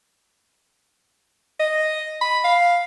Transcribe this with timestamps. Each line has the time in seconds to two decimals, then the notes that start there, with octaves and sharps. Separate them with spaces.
1.60 D#5
2.21 B5
2.45 F5